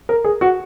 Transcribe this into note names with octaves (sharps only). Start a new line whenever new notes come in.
A#4
G#4
F#4